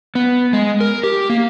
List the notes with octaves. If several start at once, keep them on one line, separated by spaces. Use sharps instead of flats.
B3
G#3
A#4
G4
A#3